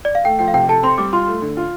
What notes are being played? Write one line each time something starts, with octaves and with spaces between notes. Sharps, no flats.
D5
F5
A3 G5
F3 G5
F5
C3 G5
A4 A5
C4 C6
G3 D6
F4 C6
A3
D3
F4